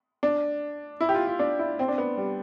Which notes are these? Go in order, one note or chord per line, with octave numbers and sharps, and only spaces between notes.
D4
E4
G4
F4
F4
D4
E4
C4
D4
B3
G3